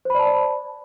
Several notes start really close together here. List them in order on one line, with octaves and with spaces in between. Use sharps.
C5 B5 D5 A5